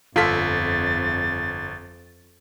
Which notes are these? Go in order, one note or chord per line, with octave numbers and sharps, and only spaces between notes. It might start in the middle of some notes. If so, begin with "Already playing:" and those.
G1 F2 F4 A4 A6 B6